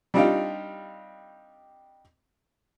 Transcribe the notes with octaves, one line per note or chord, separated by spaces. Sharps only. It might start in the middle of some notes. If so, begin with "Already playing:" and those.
G3 C4 D4 D#4 F4 G4